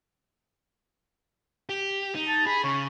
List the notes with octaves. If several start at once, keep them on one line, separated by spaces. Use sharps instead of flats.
G4
D#4
A5
G#4 B5
C#3 C#5